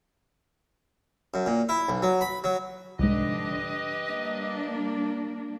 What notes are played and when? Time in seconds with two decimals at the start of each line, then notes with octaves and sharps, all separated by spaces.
1.34 F#2
1.46 A#2
1.69 E4
1.89 B1
2.03 F#3
2.21 B5
2.44 F#3
2.99 C2 G#2 D3 F3 D4 G4 B4 D#5
4.07 G3 A#3 D4